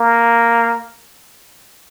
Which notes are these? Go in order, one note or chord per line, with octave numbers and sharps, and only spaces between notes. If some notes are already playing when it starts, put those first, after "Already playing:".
Already playing: A#3